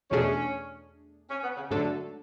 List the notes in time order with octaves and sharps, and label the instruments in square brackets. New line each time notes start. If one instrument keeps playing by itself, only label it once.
[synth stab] E2 B2 A3 D4 G#4 [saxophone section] C#4
[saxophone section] C#4
B3
C#3
[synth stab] G#2 F#3 A3 D4 A4 [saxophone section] D3